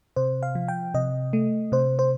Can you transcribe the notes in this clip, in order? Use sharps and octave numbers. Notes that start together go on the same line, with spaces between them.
C3 C5
F5
F3
G5
C3 D#5
A3
C3 C5
C5